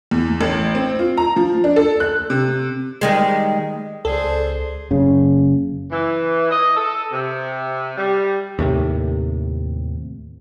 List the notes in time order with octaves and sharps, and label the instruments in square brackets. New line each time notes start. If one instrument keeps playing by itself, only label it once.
[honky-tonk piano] E2
A1
C4
F4
A#5
F3
D4
A4
F#6
C3
[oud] D#3 G3 G#3
[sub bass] C#2 [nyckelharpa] G#4 C5 [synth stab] A4 [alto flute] D5
[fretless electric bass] F#1 C#3
[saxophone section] E3
D#5
A4
C3
G3
[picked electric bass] D#2 A2 C3